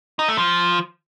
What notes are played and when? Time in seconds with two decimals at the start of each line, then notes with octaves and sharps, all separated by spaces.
0.19 D#4
0.28 A3
0.38 F3